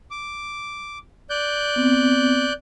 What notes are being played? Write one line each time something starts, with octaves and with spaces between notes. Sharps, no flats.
D6
D5 F#6 G6
B3 C4